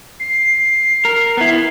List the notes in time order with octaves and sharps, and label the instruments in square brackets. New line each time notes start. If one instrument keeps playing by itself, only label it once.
[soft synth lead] C7
[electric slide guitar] A#4
B3 E4